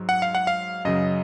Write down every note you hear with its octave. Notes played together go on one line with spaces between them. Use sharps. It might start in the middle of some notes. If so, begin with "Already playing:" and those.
Already playing: G#2 F#3
F#5
F5
F#5
F5
F#2 C#3 F#3 D#5